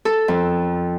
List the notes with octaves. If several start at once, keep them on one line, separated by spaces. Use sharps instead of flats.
A4
F2